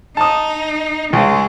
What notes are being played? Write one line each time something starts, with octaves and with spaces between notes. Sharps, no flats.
D#4 A5 D#6
C#2 G#3